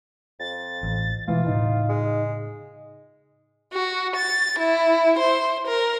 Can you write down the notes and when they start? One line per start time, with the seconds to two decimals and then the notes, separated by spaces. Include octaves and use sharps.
0.40 F2 A6
0.83 A1
1.28 B2 E3 G#3 A3 F4
1.47 A2 C#3 D#4
1.89 G#3
3.73 F#4
4.16 A6
4.59 E4
5.19 C5
5.67 A#4